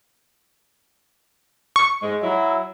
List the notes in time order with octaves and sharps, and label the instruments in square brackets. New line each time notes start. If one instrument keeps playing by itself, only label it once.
[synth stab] C#6
[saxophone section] G#2 G#3
F#3 E4